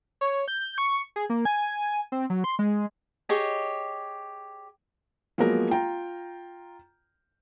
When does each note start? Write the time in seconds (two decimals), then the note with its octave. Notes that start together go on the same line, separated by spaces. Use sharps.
0.21 C#5
0.48 G6
0.78 C#6
1.16 G#4
1.30 A#3
1.45 G#5
2.12 C4
2.30 F#3
2.44 C6
2.59 G#3
3.29 G4 G#4 C#5 D#5
5.38 F3 F#3 G#3 A#3 B3 A#4
5.71 F4 G5 A#5